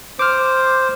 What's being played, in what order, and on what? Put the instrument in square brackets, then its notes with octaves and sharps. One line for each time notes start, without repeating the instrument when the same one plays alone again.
[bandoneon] C5 [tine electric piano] D6 F6